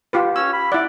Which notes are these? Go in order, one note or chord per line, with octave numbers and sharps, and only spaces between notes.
F4 G4 B4
C#4 E6
B5
E4 D5 F#5